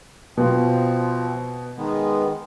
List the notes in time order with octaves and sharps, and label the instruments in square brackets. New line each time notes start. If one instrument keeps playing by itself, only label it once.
[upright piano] B2 [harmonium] F3 C4
[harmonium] D#3 G#3 B3